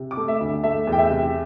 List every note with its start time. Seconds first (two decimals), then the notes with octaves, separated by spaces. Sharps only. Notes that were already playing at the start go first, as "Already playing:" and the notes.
Already playing: C3
0.11 D6
0.17 A3
0.28 E5
0.40 D2
0.64 A3 E5
0.87 E2
0.92 G5
0.98 E5
1.10 C3